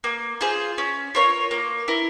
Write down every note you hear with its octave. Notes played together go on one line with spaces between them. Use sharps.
A#3
F4 G#4 C5
C#4
F4 A#4 C#5
A#3
E4 A#4